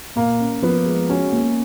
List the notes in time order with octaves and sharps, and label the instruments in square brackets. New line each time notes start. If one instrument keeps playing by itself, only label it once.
[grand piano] A#2 [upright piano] A#3
[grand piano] C#4
[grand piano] F3 [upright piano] B3
[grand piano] G#3
[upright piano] C#4 [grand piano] F#4
[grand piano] A#3